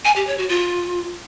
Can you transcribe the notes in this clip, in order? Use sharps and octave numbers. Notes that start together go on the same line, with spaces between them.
G#5
G4
C#5
F#4
F4